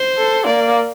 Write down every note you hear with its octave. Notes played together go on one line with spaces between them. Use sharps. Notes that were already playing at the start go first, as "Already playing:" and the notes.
Already playing: C5
A4
A#3 D5